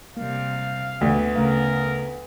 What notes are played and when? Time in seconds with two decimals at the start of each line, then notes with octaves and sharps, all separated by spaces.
0.17 C3 G3 A#3 F5
1.01 D2 B3
1.36 C#3 A3 A#4 F5